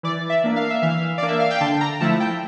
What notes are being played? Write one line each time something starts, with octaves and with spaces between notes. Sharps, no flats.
E3 D5
E5
A#3 D4
F5
E5
E3 F5
A#3 D4 D5
E5
F5
G5
D3 A5
A#5
F3 A3 E4 A5
G5